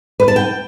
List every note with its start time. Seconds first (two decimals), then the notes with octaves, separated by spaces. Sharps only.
0.20 B4
0.28 A5
0.36 G5